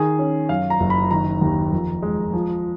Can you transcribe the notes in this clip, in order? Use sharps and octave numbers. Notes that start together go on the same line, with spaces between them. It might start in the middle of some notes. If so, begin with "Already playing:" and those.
Already playing: D#3 G#4
C#4
F#2 F5
A#5
F#1
B5
D#3 A#5
D#2
F2
G#3
F3